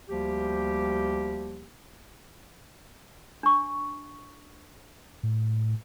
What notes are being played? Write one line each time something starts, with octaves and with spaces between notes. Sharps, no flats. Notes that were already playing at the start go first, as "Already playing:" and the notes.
D2 F3 G3 A#3 G4
D4 C#6
A2